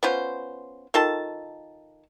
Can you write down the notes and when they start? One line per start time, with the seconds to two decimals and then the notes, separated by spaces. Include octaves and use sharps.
0.03 B3 C#4 F4 C5
0.94 D#3 F4 A4 A5